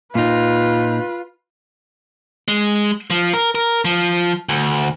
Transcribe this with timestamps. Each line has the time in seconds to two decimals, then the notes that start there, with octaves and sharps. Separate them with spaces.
0.15 A#2 D#4 F4 B4
2.48 G#3
3.10 F3
3.33 A#4
3.55 A#4
3.85 F3
4.49 D2